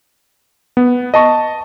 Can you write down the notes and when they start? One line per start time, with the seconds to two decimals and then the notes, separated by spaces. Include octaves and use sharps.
0.77 B3
1.14 D#5 A5 C#6